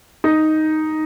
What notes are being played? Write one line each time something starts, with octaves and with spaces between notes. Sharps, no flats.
D#4